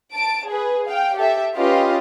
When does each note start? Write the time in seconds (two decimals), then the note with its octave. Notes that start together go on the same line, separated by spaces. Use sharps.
0.15 A5 D7
0.49 G#4 B4
0.88 F5 G5
1.17 G4 A4 E5
1.56 C#4 F4 G4 B4 D#5 F5